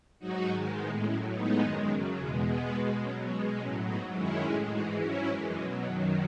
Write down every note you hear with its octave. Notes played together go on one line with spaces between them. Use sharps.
G#2 F#3 D#4 F#4
G#2 D#3 G#3
A2 G#3 B3 D#4
A2 F#3 C#4 E4
A2 G#3 B3 D#4
F#2 D#3 G#3
F#2 C#3 F#3
E2 B2 G#3 C#4
B2 G#3 B3
B2 G#3
B2 F#3 C#4
B2 G#3 B3
A2 F#3 C#4
G#2 F#3 B3 D#4
F#2 D#3 G#3 C#4 E4
A2 G#3
G#2 E3 G#3 D#4 F#4
G#2 F#3 C#4 E4
F#2 E3 G#3
B2 F#3 C#4
F#2 D#3 F#3